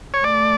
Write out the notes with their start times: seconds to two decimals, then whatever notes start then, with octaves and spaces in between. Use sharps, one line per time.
0.14 C#5
0.24 A3 D5